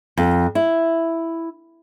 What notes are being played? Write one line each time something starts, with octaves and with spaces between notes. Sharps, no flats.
F2
E4